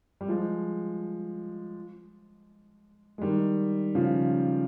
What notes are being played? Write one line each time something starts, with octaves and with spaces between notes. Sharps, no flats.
G3
F3 G#3
G#3
D#3 G3
C#3 F3